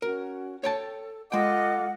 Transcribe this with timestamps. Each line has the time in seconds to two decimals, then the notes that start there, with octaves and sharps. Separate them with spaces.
0.02 C#4 F#4 A#4
0.64 A4 C#5 G5 A5
1.32 G#3 F4 A4 D#5 F#5 G5 D6